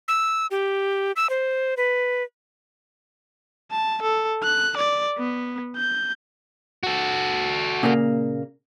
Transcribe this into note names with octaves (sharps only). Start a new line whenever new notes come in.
E6
G4
E6
C5
B4
A5
A4
F#6
D5
B3
G6
F#4 A4
A#2 C#3 A#3